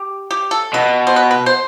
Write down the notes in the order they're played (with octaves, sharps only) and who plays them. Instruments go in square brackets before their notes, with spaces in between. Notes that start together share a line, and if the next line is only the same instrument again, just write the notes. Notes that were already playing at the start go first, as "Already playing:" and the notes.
Already playing: [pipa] G4
G4
A4
[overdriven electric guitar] B2 [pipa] B4
[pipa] C5
B4
B4
C5